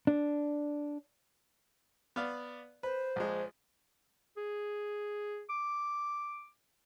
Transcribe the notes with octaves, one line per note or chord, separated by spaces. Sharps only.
D4
B3 D5 F5
B4 C5
A#1 G#3
G#4
D6